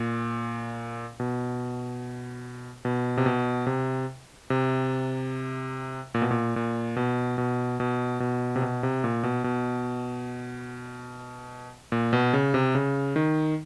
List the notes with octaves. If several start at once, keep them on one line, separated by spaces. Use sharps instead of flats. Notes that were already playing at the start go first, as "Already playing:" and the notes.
Already playing: A#2
B2
B2
C3
B2
C3
C3
A#2
B2
A#2
A#2
B2
B2
B2
B2
C3
B2
C3
A#2
B2
B2
A#2
B2
C#3
C3
C#3
D#3